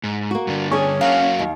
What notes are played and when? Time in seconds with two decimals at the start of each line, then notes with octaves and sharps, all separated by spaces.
0.04 G#2
0.31 A#3 F#4
0.47 G2 D3
0.71 C#4 D4 G#4
1.01 F#3 A#3 F#4 F5
1.39 D#2